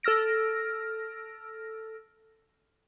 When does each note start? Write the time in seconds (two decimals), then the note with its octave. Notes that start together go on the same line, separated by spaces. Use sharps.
0.03 A4 E6 F6 A#6 D7